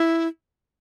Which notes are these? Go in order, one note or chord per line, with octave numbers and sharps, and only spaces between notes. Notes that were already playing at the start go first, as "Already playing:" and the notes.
Already playing: E4